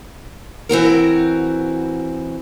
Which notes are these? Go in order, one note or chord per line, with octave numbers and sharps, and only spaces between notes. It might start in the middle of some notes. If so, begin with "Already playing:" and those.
E3 C4 F#4 A#4